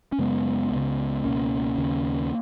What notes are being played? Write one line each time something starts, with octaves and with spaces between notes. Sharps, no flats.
C#4
F#2 C#3 G#3 B3
C#2
C#3
C#2 B2 A#3 C#4
D#2 C#3